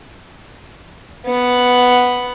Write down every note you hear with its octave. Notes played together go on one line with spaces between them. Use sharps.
B3 F#5